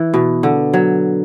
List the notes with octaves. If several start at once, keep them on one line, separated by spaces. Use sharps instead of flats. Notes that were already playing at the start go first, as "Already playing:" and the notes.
Already playing: E3
B2
D3
F#3